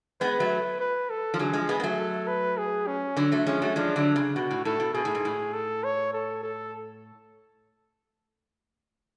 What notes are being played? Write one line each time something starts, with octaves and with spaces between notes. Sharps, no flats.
G#3 B3 B4
F#3 A3
B4
A4
F3
D3 F#3 G#4
F3 G#3
G#3 B3
B3
F#3 A3
A4
B4
G#4
C#4
D3 F#3
F#3 A3
F3 G#3 C#4
F#3 A3
F3 G#3 D4
D3 F#3
C#3
B2 F#4
A2
A2 A4
B2
B2 G#4
A2
G#2
A2
A4
C#5
A4
A4